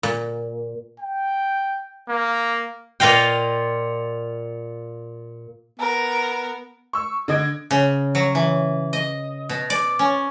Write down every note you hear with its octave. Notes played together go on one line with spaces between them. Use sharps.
A#2
G5
A#3
A#2 F4 D#5 F5 G5
B3 A#4
C#6 E6
D3 D#5 G#6 D7
C#3
F#3
E3
D#5
B2
D5
C#4